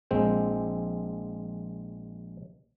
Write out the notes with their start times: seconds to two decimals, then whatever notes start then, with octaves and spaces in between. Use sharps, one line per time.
0.11 A#1 G#3 C4 G5